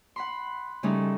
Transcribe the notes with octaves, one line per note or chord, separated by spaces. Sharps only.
F#5 B5 C6
C#3 G3 A3 C#4 D#4